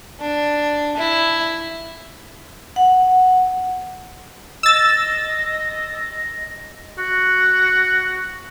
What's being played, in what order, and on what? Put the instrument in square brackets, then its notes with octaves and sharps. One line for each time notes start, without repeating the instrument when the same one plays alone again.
[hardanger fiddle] D4
E4
[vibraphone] F#5
[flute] D#5 [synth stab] E6 A6
[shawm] F#4